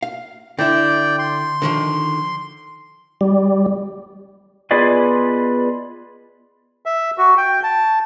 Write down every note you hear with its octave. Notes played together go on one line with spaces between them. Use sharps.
F5
D3 E4 D5 G5
C6
D3 D#3 F3
G3
B3 F4 G#4 B4 D5 D#5
E5
F#4
G5
A5